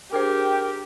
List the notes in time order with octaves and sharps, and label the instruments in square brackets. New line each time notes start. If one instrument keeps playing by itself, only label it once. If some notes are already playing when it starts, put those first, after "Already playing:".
[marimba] D4 G#4 C5 [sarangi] G4 [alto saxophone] A#4 [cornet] G5